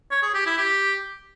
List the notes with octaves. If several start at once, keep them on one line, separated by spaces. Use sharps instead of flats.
C#5
G#4
G4
E4
G4